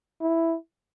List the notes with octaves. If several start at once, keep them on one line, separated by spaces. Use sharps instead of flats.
E4